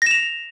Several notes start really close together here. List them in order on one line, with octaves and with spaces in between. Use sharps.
A#6 E7 F7